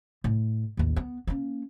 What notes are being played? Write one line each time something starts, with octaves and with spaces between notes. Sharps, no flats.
A2
A1 D#2
B3
A#3 C#4